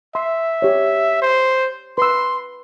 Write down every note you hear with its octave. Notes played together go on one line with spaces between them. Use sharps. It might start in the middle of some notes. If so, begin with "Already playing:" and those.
E5 C6
G4 C#5
C5
B4 C6 E6